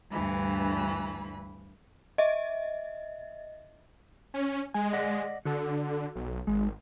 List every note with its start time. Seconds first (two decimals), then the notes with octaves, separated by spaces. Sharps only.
0.12 D2 G2 E3 B5
2.18 D#5 E5
4.34 C#4
4.74 G#3 G#5
4.93 D5 D#5 F#5
5.45 D3 F#4 A4
6.15 B1
6.47 G#1 G#3